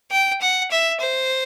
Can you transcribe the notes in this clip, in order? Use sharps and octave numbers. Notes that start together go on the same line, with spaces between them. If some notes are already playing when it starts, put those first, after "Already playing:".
G5
F#5
E5
C5